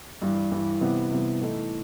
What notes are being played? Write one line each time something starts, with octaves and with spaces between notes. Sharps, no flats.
G2 E3 G3
G2 E3 G3
C3 E3 G3 B3
C3 E3 G3 B3
A2 E3 A3 D#4